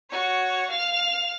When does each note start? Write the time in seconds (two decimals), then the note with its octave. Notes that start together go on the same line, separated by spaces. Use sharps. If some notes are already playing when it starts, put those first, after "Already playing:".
0.10 F#4 C#5
0.70 F5 F7